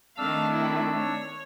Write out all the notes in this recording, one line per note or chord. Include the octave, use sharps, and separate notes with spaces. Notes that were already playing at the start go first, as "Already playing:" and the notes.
D#3 A3 C4 D4 F5 E6
E4
C#5